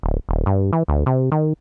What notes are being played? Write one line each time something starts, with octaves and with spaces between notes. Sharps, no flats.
D1
D#1
G2
E3
D2
C3
D#3